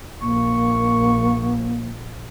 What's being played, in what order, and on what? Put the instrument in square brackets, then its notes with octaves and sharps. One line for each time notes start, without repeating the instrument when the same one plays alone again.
[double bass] A#1 [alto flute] A#3 [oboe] C#6